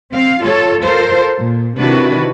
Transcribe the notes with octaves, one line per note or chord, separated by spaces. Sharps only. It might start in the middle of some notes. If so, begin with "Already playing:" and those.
C4 F5
F4 A4 C#5
F4 A4 A#4 C5
A#2
C3 D#3 D4 E4 F#4 B4